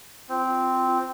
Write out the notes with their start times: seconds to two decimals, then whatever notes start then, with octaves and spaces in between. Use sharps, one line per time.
0.29 C4 F4